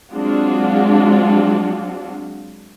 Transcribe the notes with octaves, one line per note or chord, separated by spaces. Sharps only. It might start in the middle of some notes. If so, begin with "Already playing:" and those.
F#3 G#3 C4 D4 F4 F#4